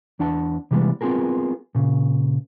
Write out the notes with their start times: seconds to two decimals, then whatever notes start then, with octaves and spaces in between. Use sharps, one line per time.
0.19 E2 D4 F#5 A5
0.71 C3 E3 G3 G#3 B3
1.01 B3 C4 F4 F#4 G#4 A#4
1.75 A#2 C#3